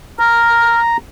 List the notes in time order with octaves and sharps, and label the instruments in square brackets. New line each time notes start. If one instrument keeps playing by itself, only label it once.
[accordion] A#5 [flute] F6